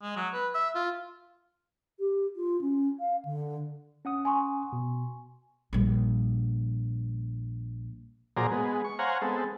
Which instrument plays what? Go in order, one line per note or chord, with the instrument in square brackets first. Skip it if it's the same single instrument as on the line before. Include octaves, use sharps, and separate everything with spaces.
[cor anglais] G#3
F#3
B4
E5
F4
[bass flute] G4
F4
C#4
F5
D3
[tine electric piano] C#4 F#5 D#6
[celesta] G#5 C6 C#6
[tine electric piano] B2
[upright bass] A#1 G3
[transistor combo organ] A#2 F#3 G#4 C5 D5 A#5
G#3 B3
C#6
C5 C#5 F5 F#5 G#5 A#5
G#3 B3 C4 A4